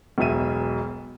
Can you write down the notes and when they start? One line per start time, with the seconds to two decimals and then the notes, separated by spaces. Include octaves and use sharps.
0.18 E1 B1 B2 E5 D#7